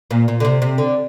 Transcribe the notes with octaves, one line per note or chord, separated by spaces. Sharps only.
A#2
A#2
D3
C3
C3
D3